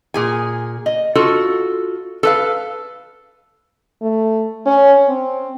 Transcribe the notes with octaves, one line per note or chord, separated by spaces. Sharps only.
A#2 G#4 G#5
D#5
F4 F#4 A4
A4 B4 F5
A3
C#4
C4